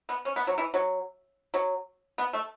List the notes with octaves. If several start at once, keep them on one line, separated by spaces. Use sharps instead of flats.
B3
C#4
B3
F#3
E3
F#3
F#3
B3
A3